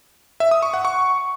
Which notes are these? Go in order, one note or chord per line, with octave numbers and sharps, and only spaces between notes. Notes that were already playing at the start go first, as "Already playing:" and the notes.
E5
D#6
C#6
F#5
C#6